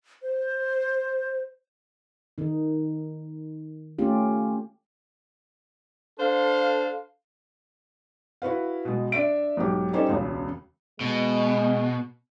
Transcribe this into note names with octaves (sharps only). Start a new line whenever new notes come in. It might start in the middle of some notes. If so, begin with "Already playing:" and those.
C5
D#3 D#4
A3 C#4 F4 G4
D4 A4 C5 F5
E4 F#4 B4 F5
B2 G#3
D4 E5 D7
B1 G#2 G4
G3 C#4 D#4 G4 A4 C5
E1 C#2 C#3
B2 G#3